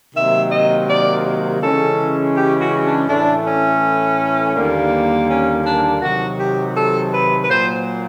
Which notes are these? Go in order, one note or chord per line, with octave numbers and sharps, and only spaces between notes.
C3 D#3 F#3 A#3 E5
D#5
D5
C#3 E3 G#3 C#4 A4
G4
F#4
D4
A2 E3 A3 D4
C#4
D#2 D3 G3 A#3
C#4
D4
C3 D#3 F#3 F#4
G4
A4
B4
B4
A#2 F#3 A#3 C5